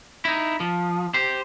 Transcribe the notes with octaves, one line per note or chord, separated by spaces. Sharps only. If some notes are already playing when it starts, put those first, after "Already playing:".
D#4 E4
F3
G4 C5